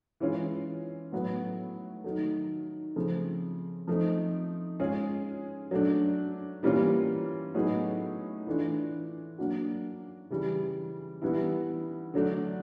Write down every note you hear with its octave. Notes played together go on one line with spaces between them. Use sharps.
E3 G#3 C#4 F4
A2 F#3 B3
D#3 F#3 A3
C#3 F3 A3 C4
F3 A3 C4 D#4
G#3 C#4 F4 G#4
F#3 A3 D4
E3 G3 A#3 C#4 F4
A2 F#3 B3 D#4 G#4
E3 A3 D4 F4
F#3 A#3 D4 F#4
C#3 E3 G3
E3 G3 B3 E4
D3 F#3 A3 D4